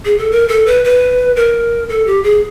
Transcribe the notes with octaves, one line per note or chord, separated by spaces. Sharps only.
G#4
A4
A#4
A4
B4
B4
A#4
A4
G4
G#4